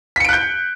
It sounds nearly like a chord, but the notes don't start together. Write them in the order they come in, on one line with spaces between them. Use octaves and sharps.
B6 C#7 D7 F#6 G6